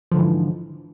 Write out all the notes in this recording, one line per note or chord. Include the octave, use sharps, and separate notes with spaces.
G#2 D3 E3 F3